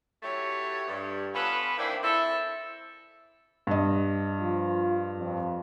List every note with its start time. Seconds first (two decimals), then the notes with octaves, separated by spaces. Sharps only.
0.23 F#3 A3 E4 G4 C#5
0.87 G2
1.34 B3 C#4 F4 A4 B4
1.78 D#3 E3 A#3 C4 D4 E4
2.03 C4 E4 A4
3.67 G2 D#5
4.41 F3 F4
5.18 F2